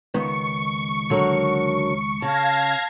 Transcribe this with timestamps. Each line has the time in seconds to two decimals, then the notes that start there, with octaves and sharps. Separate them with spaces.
0.14 C#2 D#3 B3 C#6
1.10 D3 F#3 A#4
2.22 C#3 F5 A5 G#6 A#6